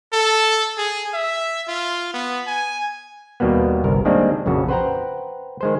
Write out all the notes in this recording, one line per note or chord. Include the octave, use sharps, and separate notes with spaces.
A4
G#4
E5
F4
B3
G#5
D#2 B2 G3 A#3 B3
G1 C2 A#4
D#3 G3 G#3 A#3 C4 D4
A#1 F2 C#3 F#4
B4 C5 F#5 G5 A#5
D#3 G#3 C5